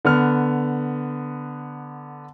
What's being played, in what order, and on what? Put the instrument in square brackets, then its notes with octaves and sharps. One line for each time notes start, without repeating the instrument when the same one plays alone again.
[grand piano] D3 B3 F6